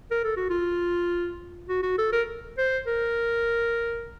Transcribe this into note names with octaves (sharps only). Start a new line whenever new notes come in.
A#4
A4
F#4
F4
F#4
F#4
A4
A#4
C5
A#4